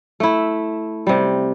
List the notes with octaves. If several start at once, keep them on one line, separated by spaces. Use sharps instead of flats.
A3 E4
C3 G3